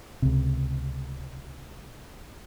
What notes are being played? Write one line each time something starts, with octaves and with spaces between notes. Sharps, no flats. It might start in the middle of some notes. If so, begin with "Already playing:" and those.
C#2 C3